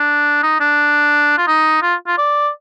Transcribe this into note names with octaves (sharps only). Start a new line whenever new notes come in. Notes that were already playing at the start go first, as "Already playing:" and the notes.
Already playing: D4
D#4
D4
F4
D#4
F4
F4
D5